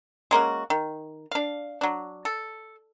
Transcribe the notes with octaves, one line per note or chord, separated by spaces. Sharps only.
G#3 A#3 C#4 F#4
D#3
D4 F5
F#3 D4
A4